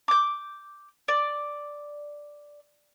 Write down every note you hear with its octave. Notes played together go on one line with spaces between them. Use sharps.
D6 G6
D5